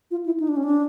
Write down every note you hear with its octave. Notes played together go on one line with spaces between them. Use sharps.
F4
E4
D#4
D4
C#4
D4